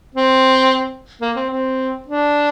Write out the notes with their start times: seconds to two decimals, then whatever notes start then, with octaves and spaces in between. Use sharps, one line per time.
0.15 C4
1.21 A#3
1.36 C4
1.51 C4
2.08 D4